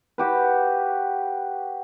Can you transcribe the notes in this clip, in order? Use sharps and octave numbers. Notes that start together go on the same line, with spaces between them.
F#4 G4 B4